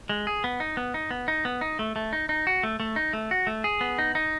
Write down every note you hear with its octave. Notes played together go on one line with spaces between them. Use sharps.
G#3
G#4
B3
D#4
B3
D#4
B3
D#4
B3
D#4
A3
A3
D#4
D#4
F#4
A3
A3
D#4
A3
F#4
A3
G#4
B3
D#4
D#4